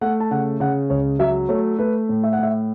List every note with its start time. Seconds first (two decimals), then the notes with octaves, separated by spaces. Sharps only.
0.01 A3 F#5
0.20 A5
0.31 C#3 F#5
0.60 C#3 F#5
0.90 C#2 C#5
1.19 F#3 E5
1.49 A3 C#5
1.79 A3 B4
2.09 A2
2.24 E5
2.33 F#5
2.39 A2 E5